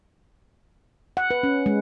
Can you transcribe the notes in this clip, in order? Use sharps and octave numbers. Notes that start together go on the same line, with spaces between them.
F#5
B4
C#4
G#3